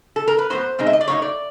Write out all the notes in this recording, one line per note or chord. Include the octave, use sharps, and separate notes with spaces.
A4
A#4
B4
A2 F#3 B3 C5
B2 G#3 C4 D#4
E5
D#5
D5
A2 F#3 A#3 D#4 C#5
D5